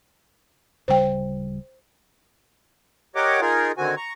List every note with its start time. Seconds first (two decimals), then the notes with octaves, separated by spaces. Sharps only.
0.88 D1 C#3 G3 C5 G5
3.15 G4 A#4 C#5 D#5 F#5 D6
3.41 D#4 F4 G#4 A#4
3.78 D3 D#3 C4 F#4 G#5
3.97 A#5 C#6